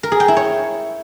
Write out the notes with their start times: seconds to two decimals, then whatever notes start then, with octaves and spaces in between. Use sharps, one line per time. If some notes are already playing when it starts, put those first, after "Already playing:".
0.03 A#4
0.12 G#4
0.20 G5
0.28 E4
0.37 C#5